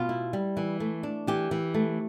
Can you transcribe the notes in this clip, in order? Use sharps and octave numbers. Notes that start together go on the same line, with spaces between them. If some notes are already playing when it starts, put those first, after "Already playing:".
Already playing: B2 F4
E4
G3
E3
A3
D4
E3 G4
E3
A3